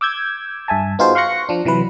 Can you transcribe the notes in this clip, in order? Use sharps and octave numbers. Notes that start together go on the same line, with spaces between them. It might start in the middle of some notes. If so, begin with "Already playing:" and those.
D6 E6 G6 G#6
G2 E5 G#5 A5
B3 D#4 F4 F#4 G#4 C5
F5 C6 C#6 F#6 A#6 C#7
F3 D4
C3 E3 F#3 B4